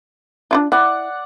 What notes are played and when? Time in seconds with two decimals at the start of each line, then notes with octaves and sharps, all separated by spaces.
0.51 D4 E4 F4
0.72 E4 D5 F#5